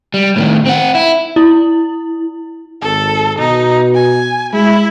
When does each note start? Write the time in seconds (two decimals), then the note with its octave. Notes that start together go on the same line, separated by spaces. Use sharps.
0.14 G3
0.36 A2 D#3
0.66 C4 F#5
0.95 E4
1.36 E4
2.82 G#1 A4
3.39 B2 D#4
3.95 G#5
4.53 G#3 E4